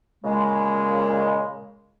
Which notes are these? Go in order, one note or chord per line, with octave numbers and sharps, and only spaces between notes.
A#2 C#3 G#3